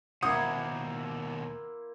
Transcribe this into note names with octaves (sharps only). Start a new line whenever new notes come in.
D#2 B2 A#3 E4 C5 F#5 D#6